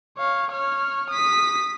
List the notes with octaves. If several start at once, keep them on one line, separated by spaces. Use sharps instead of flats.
C#5 F5
C#5 F6
D#6 B6